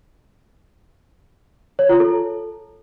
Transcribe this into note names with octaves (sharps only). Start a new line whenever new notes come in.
C#5
F4
A4